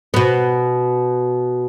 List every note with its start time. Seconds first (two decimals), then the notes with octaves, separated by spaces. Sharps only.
0.14 B2 B3